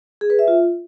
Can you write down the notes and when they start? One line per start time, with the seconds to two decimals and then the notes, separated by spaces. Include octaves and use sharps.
0.21 G#4
0.30 B4
0.39 E5
0.48 F4